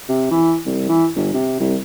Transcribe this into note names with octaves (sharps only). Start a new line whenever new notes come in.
C3
E3
C2
E3
G1
C3
C2